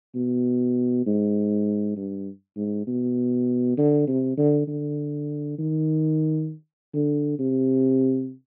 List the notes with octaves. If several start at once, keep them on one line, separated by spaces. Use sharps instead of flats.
B2
G#2
G2
G#2
B2
D3
C3
D3
D3
D#3
D3
C3